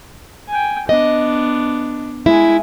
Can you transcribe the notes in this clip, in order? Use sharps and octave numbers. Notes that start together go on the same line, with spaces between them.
G5 G#5
B3 D4 D#5
G#3 E4 G#5